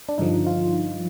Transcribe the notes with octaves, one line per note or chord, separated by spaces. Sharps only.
D4
G2 D3 F3 D#4
F4